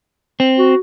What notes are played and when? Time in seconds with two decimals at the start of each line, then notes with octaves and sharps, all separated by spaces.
0.40 C4
0.58 F#4